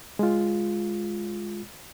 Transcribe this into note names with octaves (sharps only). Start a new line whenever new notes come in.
G#3 F4